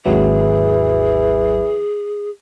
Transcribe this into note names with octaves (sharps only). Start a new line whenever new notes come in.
G#1 D#2 E3 F#3 G#4